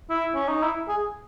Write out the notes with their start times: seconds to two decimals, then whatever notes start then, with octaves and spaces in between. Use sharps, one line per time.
0.10 E4
0.35 C#4
0.48 D#4
0.63 E4
0.88 G#4